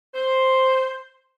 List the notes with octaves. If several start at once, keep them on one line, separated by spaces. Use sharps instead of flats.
C5